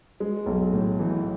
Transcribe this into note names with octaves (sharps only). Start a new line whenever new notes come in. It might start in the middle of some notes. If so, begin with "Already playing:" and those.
G#3
B1
A2
E3